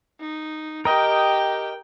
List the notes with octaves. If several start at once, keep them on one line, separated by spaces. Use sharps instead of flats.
D#4
G4 A#4 D#5 G5